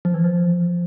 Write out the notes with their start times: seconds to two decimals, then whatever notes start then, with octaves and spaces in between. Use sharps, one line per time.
0.05 F3
0.14 E3
0.24 F3